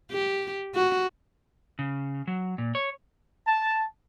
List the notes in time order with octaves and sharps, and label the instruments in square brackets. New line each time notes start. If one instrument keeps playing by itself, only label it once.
[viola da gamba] G4
F#4
[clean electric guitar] C#3
F#3
A#2
C#5
[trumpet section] A5